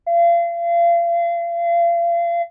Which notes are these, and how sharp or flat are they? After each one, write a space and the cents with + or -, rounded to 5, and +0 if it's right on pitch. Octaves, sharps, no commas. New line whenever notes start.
F5 -35